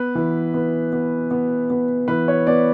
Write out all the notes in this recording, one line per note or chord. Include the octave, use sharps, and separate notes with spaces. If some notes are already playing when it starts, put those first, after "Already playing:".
Already playing: B3 B4
E3
B3
B3
B3
B3
E3 B4
C#5
B3 D5